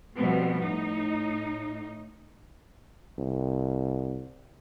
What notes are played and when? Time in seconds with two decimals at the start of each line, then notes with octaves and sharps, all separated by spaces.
0.16 B2 F3 G3 A3 B3 C4
0.60 A2 D#4
3.19 C2